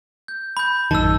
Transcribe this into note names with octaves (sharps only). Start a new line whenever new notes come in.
G6
B5 G6
A1 F#2 D#3 A5 E6